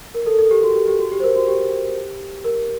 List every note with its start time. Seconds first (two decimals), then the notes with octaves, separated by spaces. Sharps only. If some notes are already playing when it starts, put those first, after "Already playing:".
0.14 A#4
0.26 A4
0.39 A4
0.51 G4
0.63 F#4
0.76 G4
0.88 G4
0.99 F#4
1.12 G4
1.20 C5
1.24 A#4
1.36 F#4
1.48 G4
2.44 A#4